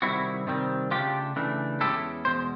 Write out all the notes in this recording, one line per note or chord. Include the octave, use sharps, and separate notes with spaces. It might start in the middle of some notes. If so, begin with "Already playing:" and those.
C3 D#3 G3 C4 E4 F#4
C3 D#3 G3 C4
C#3 E3 A3 D4 F4 G4
C#3 E3 A3 D4
E2 B2 G#3 C#4 E4 G4 A4
E2 B2 G#3 C5